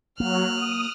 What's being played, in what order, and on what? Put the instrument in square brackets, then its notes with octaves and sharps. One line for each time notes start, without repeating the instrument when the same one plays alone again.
[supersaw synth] F#3 [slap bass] A#3 [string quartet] F6 F#6
[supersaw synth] D#6